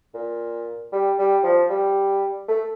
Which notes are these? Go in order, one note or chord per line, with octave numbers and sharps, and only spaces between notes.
A#2
G3
G3
F3
G3
A3